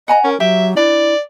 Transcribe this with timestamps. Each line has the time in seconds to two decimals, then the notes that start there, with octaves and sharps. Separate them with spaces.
0.08 D#5 F#5 G#5 A#5
0.24 C#4 A#4
0.40 F#3 G4 E5
0.77 D4 E4 D5